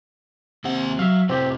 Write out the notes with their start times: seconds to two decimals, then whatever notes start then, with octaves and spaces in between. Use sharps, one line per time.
0.65 D#2 C3 F#5
0.99 F#3 E5 F5
1.29 A2 C3 C4 G4